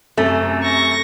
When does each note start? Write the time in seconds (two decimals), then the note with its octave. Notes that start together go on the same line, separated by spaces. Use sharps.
0.18 F#2 C3 A3
0.63 C#6 A#6